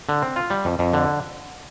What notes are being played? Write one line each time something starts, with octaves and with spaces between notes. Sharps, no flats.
D3
C4
F4
G3
F2
F2
D3